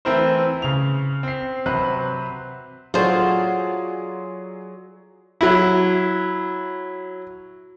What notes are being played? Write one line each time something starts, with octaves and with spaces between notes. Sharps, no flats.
E3 A3 C4 E4 A#4 C5
C#3 F7
C4 C7
C3 F#3 B4 C5 F#6
F#3 F4 F#4 G#4 A4 C5 D5
F#3 E4